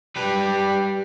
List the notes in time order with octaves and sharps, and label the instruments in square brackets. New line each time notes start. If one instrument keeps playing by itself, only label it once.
[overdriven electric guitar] G3 B4